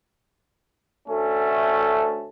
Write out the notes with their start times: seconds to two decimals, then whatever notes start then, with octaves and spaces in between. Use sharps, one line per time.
1.08 D2 A3 C#4 A4